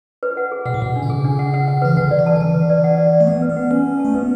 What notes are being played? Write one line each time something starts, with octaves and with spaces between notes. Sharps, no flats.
B4
F#5
G#4
B2 F#5
A2
B2 F#5
D4
D3
C#3 G#4
D4
F#5
F#5
F#5
E3 B4
D3 F#5
D5
E3
A5
D3
E3 A5
B4
D5
F#5
D5
D5
A3
B3 F#5
B4
B3
F#5
C#4 B4
A5
A5
A3
B3 B4